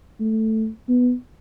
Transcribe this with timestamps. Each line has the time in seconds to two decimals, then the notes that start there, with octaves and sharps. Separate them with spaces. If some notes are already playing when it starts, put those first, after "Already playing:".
0.20 A3
0.89 B3